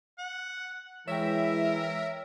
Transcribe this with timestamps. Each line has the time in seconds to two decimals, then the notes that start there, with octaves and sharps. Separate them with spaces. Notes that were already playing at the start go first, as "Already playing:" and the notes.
0.18 F#5
1.08 E3 G#3 A#4 C#5 E5 G5